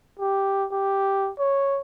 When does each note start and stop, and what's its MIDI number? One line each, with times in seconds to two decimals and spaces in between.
0.19 0.66 67
0.72 1.31 67
1.39 1.81 73